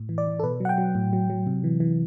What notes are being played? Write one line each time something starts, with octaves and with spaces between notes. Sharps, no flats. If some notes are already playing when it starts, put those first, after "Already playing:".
Already playing: A2
E3
D5
E3
A4
B2 B4
F#3 F#5
G5
F#3
A2
F#3
F#3
C3
E3
E3